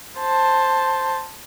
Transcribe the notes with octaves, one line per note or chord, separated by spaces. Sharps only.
C5 A5